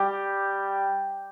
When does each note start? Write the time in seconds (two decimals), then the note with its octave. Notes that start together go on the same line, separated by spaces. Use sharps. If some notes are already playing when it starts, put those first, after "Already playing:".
Already playing: G3 G4